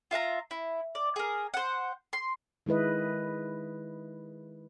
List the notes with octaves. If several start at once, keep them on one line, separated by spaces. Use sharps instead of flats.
F4 E5 F5 A#5
E4
D5
G#4 A#4
C5 F#5
C6
D#3 G#3 E4 B4 D#5